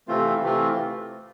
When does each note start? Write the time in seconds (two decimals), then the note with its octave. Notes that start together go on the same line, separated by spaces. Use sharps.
0.08 C3 E3 A3 C4 F4
0.42 C3 E3 A3 C4 F4